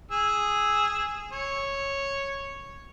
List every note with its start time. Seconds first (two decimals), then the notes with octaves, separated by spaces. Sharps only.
0.11 G#4 E6
1.32 C#5